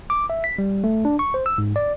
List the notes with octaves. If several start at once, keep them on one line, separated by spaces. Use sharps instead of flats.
D6
E5
B6
G3
A3
D4
C#6
C5
E6
G#2
D5